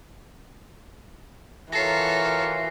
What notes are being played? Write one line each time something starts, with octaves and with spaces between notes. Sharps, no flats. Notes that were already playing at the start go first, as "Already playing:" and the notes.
E3 F4 F#4 A4 A#4 C#5 A#6 C7